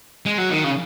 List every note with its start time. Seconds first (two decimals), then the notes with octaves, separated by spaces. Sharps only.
0.26 G#3
0.38 F#3
0.51 D#3
0.64 C#3